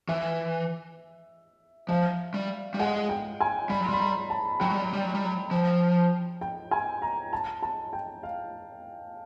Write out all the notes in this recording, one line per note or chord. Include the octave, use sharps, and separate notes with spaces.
E3 E5
F3 F5
G3
G3
G#3 F#5
G5
G#5
G3 B5
F#3
C6
G3 B5
A#5
A5
F#3 G5
G3
F#3
G3
F#3
G3
F#3
F3
G5
G#5
A#5
A5
A5
G5
F5